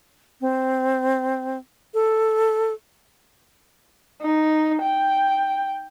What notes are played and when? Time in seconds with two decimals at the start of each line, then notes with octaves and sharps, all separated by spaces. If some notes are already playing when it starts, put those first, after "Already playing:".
0.41 C4
1.94 A4
4.22 D#4
4.82 G5